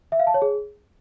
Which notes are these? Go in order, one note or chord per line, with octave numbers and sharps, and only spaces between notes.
E5
F5
A5
C#5
G#4